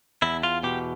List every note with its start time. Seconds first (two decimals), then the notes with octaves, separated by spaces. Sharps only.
0.22 E2 E4
0.43 F4
0.63 B2 G4